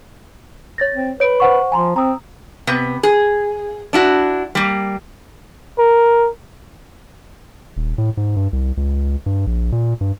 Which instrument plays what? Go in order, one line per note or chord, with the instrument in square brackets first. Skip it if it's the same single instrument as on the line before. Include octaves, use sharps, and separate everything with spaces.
[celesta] C#5 A6 A#6
[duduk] C4
[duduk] B4 [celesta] C#5 D7
[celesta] C5 F#5 C#6
[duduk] F3 [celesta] G#5 A#5 C6
[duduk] C4 [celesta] A#5 D#6 E6
[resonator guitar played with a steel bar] C3 B3
G#4
D4 E4 F#4
G3 A#3
[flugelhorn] A#4
[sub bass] D#1
A2
G#2
G2
C2
C#2
G2
A#1
A#2
G2